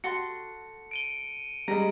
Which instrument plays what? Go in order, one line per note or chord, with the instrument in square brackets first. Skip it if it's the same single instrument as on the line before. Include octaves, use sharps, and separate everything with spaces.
[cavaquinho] F#4 A4 C6 [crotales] C#7
[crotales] D7 D#7 G7
[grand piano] G3 G#3 [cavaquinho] A#5